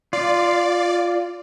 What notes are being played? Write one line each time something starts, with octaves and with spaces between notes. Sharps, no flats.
F4 D5